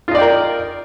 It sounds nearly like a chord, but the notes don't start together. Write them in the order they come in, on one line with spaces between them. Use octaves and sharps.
F4 D#4 D5 G5 A#4